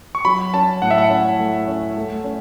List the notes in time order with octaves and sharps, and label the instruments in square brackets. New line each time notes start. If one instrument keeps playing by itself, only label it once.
[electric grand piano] C#6
[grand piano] F#3 [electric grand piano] B5
[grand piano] C#4 [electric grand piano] A5
[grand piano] A2 [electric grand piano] F#5
[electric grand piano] E5
F#5
[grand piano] C#4
A3
C#4
A3
C#4